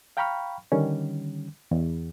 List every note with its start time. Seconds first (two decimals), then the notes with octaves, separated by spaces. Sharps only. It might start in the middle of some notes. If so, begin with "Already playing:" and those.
0.17 F5 G5 A#5 B5 C#6 F6
0.72 D3 D#3 G3 C#4
1.71 E2